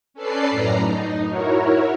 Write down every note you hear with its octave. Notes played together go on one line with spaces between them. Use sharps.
C#4 A4 B4 D5 C7
F#2 A2 A#5
D#4
E4 F#4 A#4 C#5